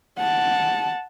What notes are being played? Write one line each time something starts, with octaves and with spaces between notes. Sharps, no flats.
F#5 A5